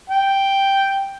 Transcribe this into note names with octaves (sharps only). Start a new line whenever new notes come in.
G5